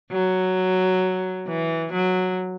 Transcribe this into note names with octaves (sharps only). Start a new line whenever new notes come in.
F#3
E3
F#3